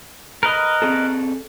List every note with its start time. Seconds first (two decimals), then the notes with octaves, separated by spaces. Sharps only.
0.43 A#4 B4 D#5
0.82 C4 G#4 A4